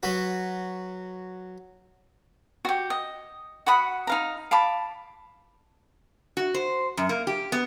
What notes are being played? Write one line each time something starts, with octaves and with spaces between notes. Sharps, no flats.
F#3 F#4 B4
F#4 G4
D#5
F#4 F#5 B5 D#6
D#4 F5 A#5
F5 A5 B5 D6
F#4
C5
F#2
A#3
G4
B3